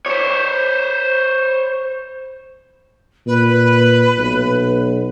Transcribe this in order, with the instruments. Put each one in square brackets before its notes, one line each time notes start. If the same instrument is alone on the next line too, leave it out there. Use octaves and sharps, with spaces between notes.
[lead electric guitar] C5 C#5
[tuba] A#2 [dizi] B4
[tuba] B1